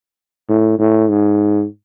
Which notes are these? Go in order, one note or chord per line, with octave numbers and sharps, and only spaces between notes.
A2
A2
G#2